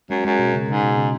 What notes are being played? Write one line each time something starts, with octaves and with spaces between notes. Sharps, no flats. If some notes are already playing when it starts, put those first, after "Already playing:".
F#2 G#3
F#2 G#3
B2
C#3
G#2 C#3
B2
C#3